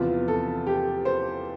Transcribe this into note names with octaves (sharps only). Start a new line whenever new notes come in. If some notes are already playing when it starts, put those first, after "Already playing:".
Already playing: E2 C3 F3 B3 F4
A4
G4
C5